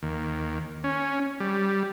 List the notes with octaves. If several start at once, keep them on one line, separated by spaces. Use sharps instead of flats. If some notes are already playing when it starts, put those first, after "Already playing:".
D#2
C#4
G3